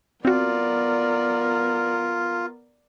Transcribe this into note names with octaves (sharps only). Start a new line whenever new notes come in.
B3 C4 F4 F#4 A#4 D5